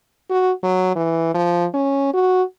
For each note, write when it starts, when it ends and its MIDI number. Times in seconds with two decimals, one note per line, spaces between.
0.30 0.51 66
0.63 0.94 54
0.95 1.33 52
1.34 1.65 53
1.74 2.09 61
2.13 2.42 66